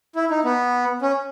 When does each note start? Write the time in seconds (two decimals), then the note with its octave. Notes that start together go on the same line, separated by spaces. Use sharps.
0.15 E4
0.30 D#4
0.44 B3
1.02 C#4